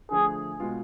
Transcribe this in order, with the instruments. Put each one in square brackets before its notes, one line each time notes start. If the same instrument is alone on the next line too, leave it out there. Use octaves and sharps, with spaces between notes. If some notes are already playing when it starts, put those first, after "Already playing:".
[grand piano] D3 F3 A3 D4 [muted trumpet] G#4
[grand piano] B2 G#3 B3 F4